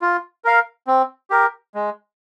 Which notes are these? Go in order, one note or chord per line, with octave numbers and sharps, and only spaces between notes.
F4
A#4 F5
C4
G4 A#4
G#3